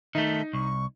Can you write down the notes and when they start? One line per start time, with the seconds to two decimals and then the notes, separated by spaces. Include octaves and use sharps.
0.15 D#3 A3 D#4 E5
0.53 C2 C#6